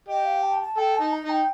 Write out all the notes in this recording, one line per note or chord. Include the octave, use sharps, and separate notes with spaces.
G4 D#5
F5
A5
A5
A4 G5
A5
D#4
A#5
D#4
G5